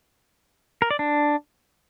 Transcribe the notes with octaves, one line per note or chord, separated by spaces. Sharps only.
A#4
D5
D4